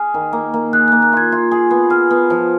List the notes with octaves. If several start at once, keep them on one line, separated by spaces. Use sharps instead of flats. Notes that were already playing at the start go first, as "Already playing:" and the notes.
Already playing: G#4 F6
D#3
A#3
A#3
G#4 F#6
A#3 F#6
F#6
F4 G#6
F4
G#4
B3
G#4 F6
B3
F3